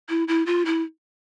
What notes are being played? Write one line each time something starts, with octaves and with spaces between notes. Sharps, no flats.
E4
E4
F4
E4